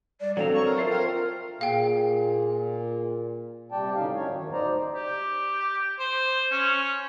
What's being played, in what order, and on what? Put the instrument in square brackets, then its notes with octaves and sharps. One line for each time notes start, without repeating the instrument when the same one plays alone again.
[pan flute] G3 [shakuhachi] D5
[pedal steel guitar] F#3 C4 A#5 [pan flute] D4 [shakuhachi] A4 [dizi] F5
[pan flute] C#5 [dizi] C#6
[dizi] A#4
[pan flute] F4 [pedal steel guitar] A4 C5 F5 [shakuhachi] E5
[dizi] A#4 [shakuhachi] G5
[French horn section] A#2 [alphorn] G#4 [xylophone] F5 G5
[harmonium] C3 G3 D5 G5 A5
D2 A2 D3 C#4 D#4 F5
F#2 C#5
D#3 F#3
E2 G#2
D2 D#4 C5 D5 A#5
[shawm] G4
C5
C#4